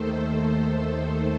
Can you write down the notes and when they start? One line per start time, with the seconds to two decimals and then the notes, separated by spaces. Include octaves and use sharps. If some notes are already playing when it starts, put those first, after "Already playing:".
Already playing: D#2 D#3 A3 A4 C5
0.11 A4